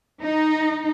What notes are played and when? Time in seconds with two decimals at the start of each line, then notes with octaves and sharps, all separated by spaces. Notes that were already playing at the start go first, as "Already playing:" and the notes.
0.23 D#4